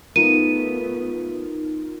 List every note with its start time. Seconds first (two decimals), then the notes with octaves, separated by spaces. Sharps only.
0.16 A3 B3 D#4 F4 A#4 D#7